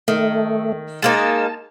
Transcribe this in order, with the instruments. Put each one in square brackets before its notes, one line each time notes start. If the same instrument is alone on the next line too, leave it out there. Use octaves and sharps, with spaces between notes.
[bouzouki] D#3 [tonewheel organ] A3
[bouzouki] G#3 A#3 D#4 [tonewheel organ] A5